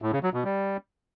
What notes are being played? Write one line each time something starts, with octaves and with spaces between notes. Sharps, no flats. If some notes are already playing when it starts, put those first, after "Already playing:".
A2
C#3
F#3
B2
G3